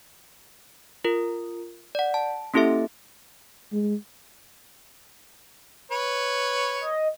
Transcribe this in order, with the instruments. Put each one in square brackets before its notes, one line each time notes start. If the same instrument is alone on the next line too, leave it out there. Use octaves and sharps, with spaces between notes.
[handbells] F4 A#4
D5 F#5
A5
A#3 C#4 E4 G4 A4 E5
[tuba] G#3
[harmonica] B4 C#5
[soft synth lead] D#5